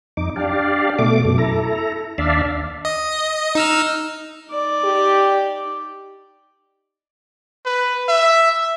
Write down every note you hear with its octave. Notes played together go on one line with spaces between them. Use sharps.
F2 D#4 D6
D4 G4 D5 F5
B2 A3 D6
F#2 B2
E4 A4 A#5
D#2 D4 D5 E5 F5
D#5
D#4 E6 F6
D#4 D5
G4
B4
E5